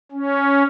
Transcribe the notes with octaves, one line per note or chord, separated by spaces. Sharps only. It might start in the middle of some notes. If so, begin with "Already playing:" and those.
C#4